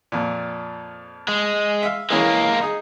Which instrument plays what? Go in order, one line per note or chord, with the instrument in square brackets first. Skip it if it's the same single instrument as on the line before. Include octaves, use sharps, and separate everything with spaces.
[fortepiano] F2 A#2
[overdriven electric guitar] G#3
[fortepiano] E5 F5
[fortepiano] E3 C#4 G#4 [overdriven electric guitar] G#3 A#3
[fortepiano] D#4 G#4